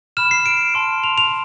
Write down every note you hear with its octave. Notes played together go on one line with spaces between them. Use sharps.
B5 F6 E7
C7
D7
A5 C6 F6
F7
F7